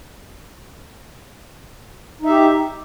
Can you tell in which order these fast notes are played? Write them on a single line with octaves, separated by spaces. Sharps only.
D#4 E5 G4